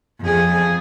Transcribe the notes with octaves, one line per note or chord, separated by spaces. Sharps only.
F2 G#4